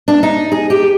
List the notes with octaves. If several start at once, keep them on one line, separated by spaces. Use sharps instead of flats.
D4
D#4
G#4
G4